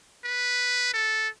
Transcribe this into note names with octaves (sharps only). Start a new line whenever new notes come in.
B4
A4